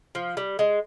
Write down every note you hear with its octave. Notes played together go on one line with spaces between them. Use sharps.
F3
G3
G#3